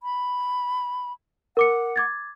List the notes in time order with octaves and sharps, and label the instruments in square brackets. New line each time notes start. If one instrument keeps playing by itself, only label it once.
[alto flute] B5
[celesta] A#4 D6 C#7 [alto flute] F#5
[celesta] D6 G#6 A6